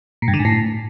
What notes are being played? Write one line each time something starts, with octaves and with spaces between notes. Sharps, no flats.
A#2
G2
D3
G#2
A2